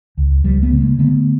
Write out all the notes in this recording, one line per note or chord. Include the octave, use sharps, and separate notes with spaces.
C#2
C#2 F3 G3
A3 B3
C#3
G#3 A#3
D3 A3 B3